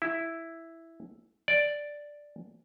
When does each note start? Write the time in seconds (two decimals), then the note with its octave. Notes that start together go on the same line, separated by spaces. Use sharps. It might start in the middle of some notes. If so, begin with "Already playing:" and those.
0.02 E4
1.48 D5